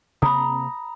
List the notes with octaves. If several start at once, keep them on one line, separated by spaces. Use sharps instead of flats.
C3 A#3 C4 A#5 B5 D#6